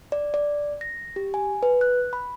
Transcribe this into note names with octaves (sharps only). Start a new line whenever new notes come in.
D5
D5
A#6
G4
G#5
B4
F#6
B5